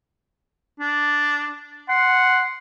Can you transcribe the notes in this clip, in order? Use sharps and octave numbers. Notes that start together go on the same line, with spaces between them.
D4
F#5 C6